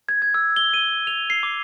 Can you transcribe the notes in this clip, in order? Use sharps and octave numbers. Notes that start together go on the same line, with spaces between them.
G#6
G#6
E6
G7
D#7
F7
C7
D6